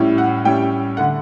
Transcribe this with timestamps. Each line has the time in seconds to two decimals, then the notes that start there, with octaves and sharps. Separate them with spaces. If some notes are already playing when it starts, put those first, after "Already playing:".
Already playing: A2 G3 C#4 E4
0.18 F#5
0.44 A2 G3 C#4 E4 G5
0.97 D3 A3 F#5